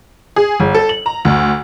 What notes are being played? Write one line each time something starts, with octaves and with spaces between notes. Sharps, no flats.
G#4
G1
A4
F#7
A#5
D2